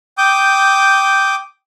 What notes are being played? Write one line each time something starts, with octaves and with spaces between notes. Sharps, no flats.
G5 D6 D#6 G6